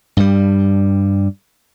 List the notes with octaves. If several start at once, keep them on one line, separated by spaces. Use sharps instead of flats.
G2 G3